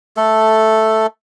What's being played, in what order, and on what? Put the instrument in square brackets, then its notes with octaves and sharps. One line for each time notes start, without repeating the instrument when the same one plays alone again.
[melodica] A3 A4